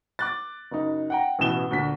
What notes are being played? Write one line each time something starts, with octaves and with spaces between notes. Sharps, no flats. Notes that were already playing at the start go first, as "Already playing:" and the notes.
D6 F#6 A6
F#1 D#4
F#5 G5 A#5
A1 B2 E3 E7 G7
D2 A#2 D3 B6